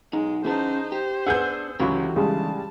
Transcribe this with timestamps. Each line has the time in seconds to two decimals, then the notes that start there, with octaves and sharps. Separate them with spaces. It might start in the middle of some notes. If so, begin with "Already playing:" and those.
0.13 B1 G#3 D#4
0.45 E3 C#4 D#4 G#4 C5 A5
0.92 G4 C5
1.27 B3 D4 G#4 F#5 E6 G6
1.80 C#2 D3 E3 F#3 F#4 G4 B5
2.16 C#3 G3 G#3 A5